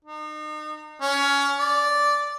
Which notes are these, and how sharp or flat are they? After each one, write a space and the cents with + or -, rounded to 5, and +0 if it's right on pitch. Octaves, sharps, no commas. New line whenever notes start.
D#4 -35
C#4 +20
D5 -5